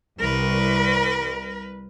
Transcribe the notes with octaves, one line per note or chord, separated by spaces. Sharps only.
C2 A#4 B4